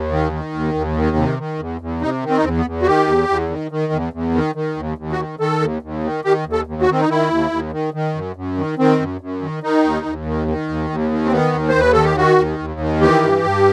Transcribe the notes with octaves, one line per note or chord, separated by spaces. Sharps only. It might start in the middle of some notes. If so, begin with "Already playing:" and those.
Already playing: D#2
D#3
D#3
D#2
D#2
D#3
C3
D#3
E2
E2
C3 D#4
D#3
C4
D#4
E2 C4
B3
E2
F#4
D#3 G4
E2
E2
D#3
D#3
E2
E2
D#3
D#3
D#2
D#2
F#4
D#3
D#3 A4
D#2
D#2
D#3
D#3 G4
D#2
A4
D#2
F#4
D#3 C4
D#4
D#3 E4
D#2
D#2
D#3
D#3
F#2
F#2
D#3
D#3 C4
F#2
F#2
D#3
D#3 D#4
D#2
D#2
D#3
D#3
D#2
D#2
D#3
C4
D#3 B3
D#2
C5
D#2
B4
D#3 A4
G4
D#3 F#4
D#2
D#2
D#3
E3 G4
G2
G2